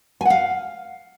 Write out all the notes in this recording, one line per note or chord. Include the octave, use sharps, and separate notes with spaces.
F5 F#5 G#5